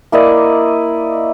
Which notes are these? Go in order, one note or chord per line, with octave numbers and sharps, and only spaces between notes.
A#3 E4 D5 D#5